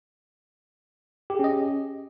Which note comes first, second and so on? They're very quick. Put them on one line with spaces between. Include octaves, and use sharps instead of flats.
G4 G#4 C#4 D#5